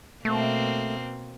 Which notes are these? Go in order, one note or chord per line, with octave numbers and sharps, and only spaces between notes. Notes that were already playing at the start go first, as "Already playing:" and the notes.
B2 A3 A#3 C4